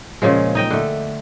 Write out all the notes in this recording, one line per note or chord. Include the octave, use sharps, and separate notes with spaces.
A#2 C#3 F3 G#3
D#4 D#5 G5
D3 A3